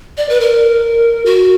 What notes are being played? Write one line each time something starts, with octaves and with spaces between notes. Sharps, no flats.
D5
B4
A#4
F#4